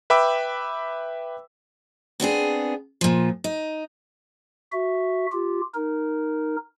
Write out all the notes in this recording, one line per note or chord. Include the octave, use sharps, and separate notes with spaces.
B4 E5 G5 B5 D6 E6
B3 C4 D4 G#4
A#2 F3
D#4
F#4 E5
F4 G4
D#4 A#4